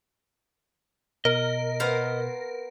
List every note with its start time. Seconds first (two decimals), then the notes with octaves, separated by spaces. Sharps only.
1.25 B2 A#4 D#5
1.80 B3 C5 F5